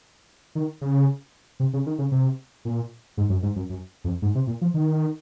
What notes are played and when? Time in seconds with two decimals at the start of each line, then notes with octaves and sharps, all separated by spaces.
0.55 D#3
0.81 C#3
1.60 C3
1.73 C#3
1.86 D#3
1.98 C#3
2.12 C3
2.65 A#2
3.17 G#2
3.29 F#2
3.43 G#2
3.56 F#2
3.69 F#2
4.04 F2
4.22 G#2
4.35 C3
4.47 A#2
4.61 F3
4.74 D#3